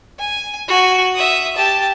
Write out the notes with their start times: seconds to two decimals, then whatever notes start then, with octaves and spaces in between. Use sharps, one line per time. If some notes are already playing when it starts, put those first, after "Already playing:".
0.19 G#5
0.68 F#4 G#5
1.15 E5 D#6
1.56 G4 A5